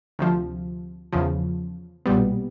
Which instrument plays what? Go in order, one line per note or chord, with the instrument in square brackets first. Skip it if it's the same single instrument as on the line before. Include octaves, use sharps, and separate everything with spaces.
[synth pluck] D2 C3 F3
E2 C#3 F3
B1 A#2 G3 B3